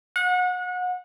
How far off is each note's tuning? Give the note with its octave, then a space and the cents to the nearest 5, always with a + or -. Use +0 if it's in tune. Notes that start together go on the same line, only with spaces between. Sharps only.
F#5 -30